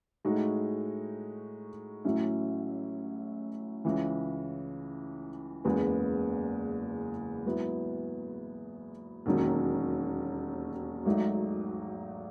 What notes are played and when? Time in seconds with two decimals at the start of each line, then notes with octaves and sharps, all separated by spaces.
0.25 A2 G#3 D#4 F#4
2.05 A1 A2 F#3 C#4 E4
3.85 C#2 C#3 E3
5.65 F#1 E2 C#3 G#3 B3
7.45 G#2 F#3 B3 E4
9.26 E1 D#2 D#3 F#3 C#4
11.06 G#1 G#2 F#3 A3 D#4